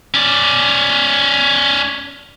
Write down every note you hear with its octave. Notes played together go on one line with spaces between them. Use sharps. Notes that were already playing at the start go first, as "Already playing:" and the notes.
C#4 D5